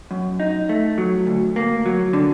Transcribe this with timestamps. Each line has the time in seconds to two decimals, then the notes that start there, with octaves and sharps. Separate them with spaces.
0.11 F#2
0.40 D#4
0.69 A3
0.98 F#3
1.27 D2
1.56 A#3
1.86 F#3
2.13 D3